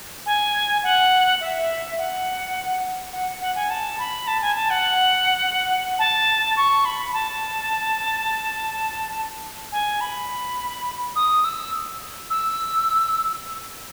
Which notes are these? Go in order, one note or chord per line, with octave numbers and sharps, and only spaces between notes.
G#5
F#5
E5
F#5
F#5
F#5
G#5
A5
B5
A5
G#5
A5
F#5
A5
C#6
B5
B5
A5
G#5
B5
D#6
E6
E6